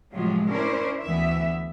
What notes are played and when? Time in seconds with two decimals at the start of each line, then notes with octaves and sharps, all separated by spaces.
0.14 A2 C3 F3 F#3 G#3 F4
0.49 C#4 D4 E4 A#4 C5
1.01 D2 E3 B3 E5